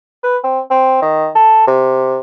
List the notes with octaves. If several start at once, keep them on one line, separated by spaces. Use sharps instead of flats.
B4
C4
C4
D#3
A4
C3